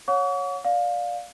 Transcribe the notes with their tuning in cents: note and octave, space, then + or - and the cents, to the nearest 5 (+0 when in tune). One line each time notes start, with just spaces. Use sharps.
C#5 +0 F#5 -35 C#6 +45
D5 +0 F5 +20